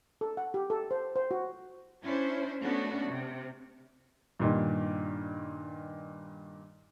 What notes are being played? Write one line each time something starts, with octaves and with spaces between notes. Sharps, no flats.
A4
F#5
G4
A4
C5
C5
F#4
C#4 D4 E4 C5
A3 B3 C#4 D4 F#4
C3
G2 A#2 D#3